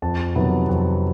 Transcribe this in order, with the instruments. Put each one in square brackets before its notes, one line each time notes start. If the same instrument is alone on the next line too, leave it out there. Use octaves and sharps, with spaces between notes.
[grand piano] F2 A5
C3 D#3 F#3 B3
F2